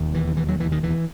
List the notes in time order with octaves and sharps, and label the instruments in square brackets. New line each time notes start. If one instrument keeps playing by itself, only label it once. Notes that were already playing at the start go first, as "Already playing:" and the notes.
Already playing: [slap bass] E1 D#2
E3
E3
F#3
E3
D#3
E3